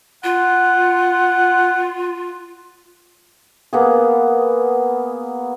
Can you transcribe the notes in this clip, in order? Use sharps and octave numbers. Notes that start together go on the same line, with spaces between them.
F4 F#5
A#3 B3 G#4